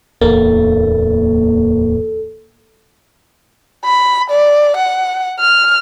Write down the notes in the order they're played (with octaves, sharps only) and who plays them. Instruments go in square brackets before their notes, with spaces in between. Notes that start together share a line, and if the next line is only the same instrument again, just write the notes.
[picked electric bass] D1 E2 [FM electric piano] A#3 [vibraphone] A4
[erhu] B5
D5
F#5
F6